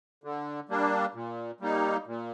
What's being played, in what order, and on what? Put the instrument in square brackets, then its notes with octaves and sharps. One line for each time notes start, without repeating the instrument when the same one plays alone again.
[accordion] D3
G3 A#3 D4
A#2
G3 A#3 D#4
A#2